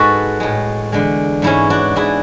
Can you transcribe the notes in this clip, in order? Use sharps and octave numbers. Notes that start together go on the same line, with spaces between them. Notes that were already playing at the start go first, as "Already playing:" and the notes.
Already playing: G#2 G#3 F#4 A4 B4
A2 G#3
E2 D3 G#3
G#2 E3 G#3 C#4 E4
D4 F#4
G#2 G#3 E4 G#4